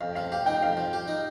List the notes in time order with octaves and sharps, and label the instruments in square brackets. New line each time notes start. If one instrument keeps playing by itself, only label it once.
[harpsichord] F2 [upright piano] F5
[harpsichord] F3 [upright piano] F5
[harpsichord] G4 [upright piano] F5
[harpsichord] D#4 [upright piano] G5
[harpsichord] F2 [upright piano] F5
[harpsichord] F3
G4
D#4